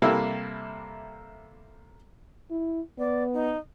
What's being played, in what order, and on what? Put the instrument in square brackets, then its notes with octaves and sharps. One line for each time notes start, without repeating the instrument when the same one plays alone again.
[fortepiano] C3 G3 A#3 E4 A4
[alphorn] E4
[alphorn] B3 [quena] D5
[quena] D#4